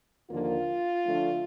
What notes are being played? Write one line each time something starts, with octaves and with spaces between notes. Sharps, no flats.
D#2 D3 F3 A#3 F4
D3 F3 A3 D4